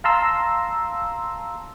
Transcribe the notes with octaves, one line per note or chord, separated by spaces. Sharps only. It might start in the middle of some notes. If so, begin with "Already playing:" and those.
F5 A5 A#5 C6 E6